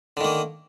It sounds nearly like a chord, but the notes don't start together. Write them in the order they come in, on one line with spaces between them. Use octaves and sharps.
D3 D#3 A#3